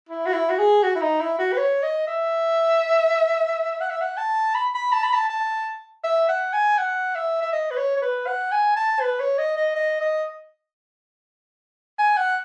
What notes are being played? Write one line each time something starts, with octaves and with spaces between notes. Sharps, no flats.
E4
F#4
E4
F#4
G#4
F#4
E4
D#4
E4
F#4
B4
C#5
D#5
E5
F#5
E5
F#5
A5
B5
B5
A5
B5
A5
A5
E5
F#5
G#5
F#5
E5
E5
D#5
B4
C#5
C#5
B4
F#5
G#5
A5
B4
C#5
D#5
D#5
D#5
D#5
G#5
F#5